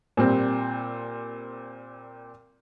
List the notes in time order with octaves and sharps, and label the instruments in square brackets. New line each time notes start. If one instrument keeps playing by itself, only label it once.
[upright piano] A#2 G3 C4